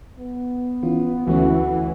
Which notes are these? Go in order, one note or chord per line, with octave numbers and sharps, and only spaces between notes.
B3
E3 C#4 F4
D2 E3 A3 C#4 F#4